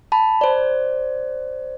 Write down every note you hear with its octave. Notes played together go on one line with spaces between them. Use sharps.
A5 B5
C5 D5